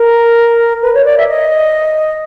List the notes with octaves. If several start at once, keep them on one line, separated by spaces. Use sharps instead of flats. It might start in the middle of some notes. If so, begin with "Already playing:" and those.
Already playing: A#4
B4
C#5
D5
E5
D#5